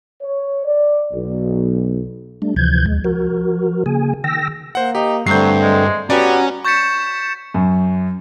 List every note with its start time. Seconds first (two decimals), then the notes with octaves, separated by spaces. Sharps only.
0.21 C#5
0.65 D5
1.13 B1
2.42 G3 A3 D4
2.56 D2 C3 E3 F3 G6 G#6
2.86 D#2 G#3
3.04 F3 F#4 A#4
3.86 C#3 A#3 G#4 G#5
4.24 D#3 G5 E6 A#6
4.75 A#3 C5 F#5
4.95 D#4 G4
5.27 G2 D3 F#3 A3 C4 G6 C7
5.62 G#3
6.10 B3 C#4 F#4 G4 D5 A#5
6.65 C#6 G6 A6 B6 C#7 E7
7.54 F#2